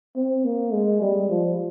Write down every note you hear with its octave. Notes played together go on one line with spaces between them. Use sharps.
C4
A#3
G#3
G3
F3